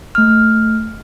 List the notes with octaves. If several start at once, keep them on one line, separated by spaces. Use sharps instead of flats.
A3 F6